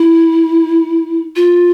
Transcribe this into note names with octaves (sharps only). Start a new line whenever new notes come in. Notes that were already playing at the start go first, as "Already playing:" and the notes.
Already playing: E4
F4